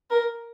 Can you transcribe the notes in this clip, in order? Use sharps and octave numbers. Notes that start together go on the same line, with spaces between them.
A#4